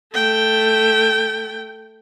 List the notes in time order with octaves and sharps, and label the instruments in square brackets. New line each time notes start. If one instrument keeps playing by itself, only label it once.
[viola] A3 G5